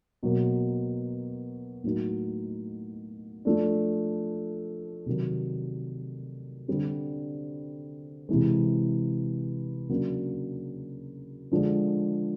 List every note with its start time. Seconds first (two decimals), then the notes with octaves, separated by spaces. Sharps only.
0.23 B2 F#3 A#3
1.84 A2 F#3 A#3 D#4 F#4
3.45 F3 A3 D4
5.06 C3 D#3 F#3
6.68 D3 G3 C4
8.29 C3 E3 G#3
9.89 C#3 F#3 A#3 D4
11.52 D3 F3 G#3